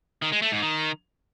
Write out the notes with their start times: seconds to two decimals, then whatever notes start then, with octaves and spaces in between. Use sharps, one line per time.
0.22 D#3
0.32 G#3
0.42 A3
0.52 G#2
0.62 D#3